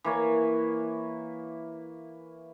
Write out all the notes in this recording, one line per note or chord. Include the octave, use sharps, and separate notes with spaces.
E3 A#3 C#5